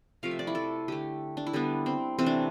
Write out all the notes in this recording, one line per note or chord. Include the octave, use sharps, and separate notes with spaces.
C3 F3 A3 F5
E5
D5
E4
A4
D3 A3 G4
D4
E4
D3 G3 B3 D4
C4
C3 E3 A3 C4
D4